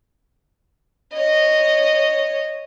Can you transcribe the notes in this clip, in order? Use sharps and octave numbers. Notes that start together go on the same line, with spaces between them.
C#5 D#5